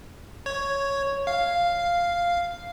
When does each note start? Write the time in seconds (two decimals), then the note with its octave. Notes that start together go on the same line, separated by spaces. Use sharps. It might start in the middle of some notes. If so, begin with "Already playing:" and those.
0.46 C#5
1.27 F5